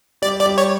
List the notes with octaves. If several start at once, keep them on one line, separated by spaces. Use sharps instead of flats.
G3 G4 D5
D5
G3 G4
C#5